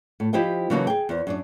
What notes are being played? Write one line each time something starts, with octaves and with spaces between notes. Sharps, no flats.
A2
F3 E4 G4 C5 D#5 G5
C#3 E3 F#3 A#3 D#4 A5
G#4 G5
E2 C5
F#2 D4 D5